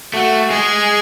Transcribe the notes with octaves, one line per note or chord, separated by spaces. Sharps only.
A3 F#4
G#3 G#4